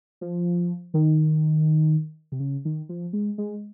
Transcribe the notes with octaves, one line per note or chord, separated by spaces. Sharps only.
F3
D#3
C3
C#3
D#3
F3
G#3
G#3